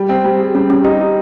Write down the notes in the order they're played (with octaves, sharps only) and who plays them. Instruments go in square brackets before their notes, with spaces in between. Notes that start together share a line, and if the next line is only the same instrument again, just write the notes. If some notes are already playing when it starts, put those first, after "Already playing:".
Already playing: [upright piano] G3
C4
G3
G#4
[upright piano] G3 [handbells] C#4
[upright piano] G3 [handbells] C#4
[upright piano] D#4 [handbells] G4
[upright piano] D#4